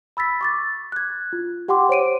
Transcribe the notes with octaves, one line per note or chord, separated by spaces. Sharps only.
B5 E6 A6 B6
C#6 D6 A6
F#6 G#6
F4
G4 F#5 G5 C6 D6
C5 C#5 D7 D#7